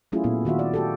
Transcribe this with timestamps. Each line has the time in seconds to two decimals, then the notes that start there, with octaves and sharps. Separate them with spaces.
0.12 F#3 A3 C#4 E4 F4 G#4
0.24 A#2 B3 E4
0.45 D#3 F4 F#4 E5
0.59 D5
0.74 F#4 G4 A4